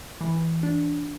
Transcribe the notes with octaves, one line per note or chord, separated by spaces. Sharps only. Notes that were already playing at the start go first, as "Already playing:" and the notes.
E3
D4